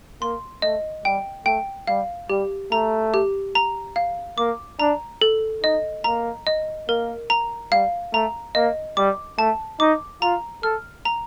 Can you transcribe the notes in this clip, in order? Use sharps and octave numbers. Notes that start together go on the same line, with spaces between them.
A#3 C6
A3 D#5
G3 G5
A3 G5
G3 F5
G3 G4
A3 A#5
G4
A#5
F5
A#3 D6
D4 A#5
A4
D#4 D#5
A#3 A#5
D#5
A#3 A#4
A#5
G3 F5
A3 A#5
A#3 D#5
G3 D6
A3 A5
D#4 D6
F4 A#5
A4 F6
A#5